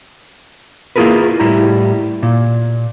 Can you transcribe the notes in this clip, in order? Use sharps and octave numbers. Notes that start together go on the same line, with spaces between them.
A#3 E4 F4 G#4 A#4 B4
A2 G3 E4 A#5
A#2